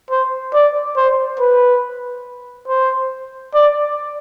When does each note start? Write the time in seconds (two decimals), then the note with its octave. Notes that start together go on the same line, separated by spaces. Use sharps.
0.11 C5
0.54 D5
0.96 C5
1.39 B4
2.68 C5
3.54 D5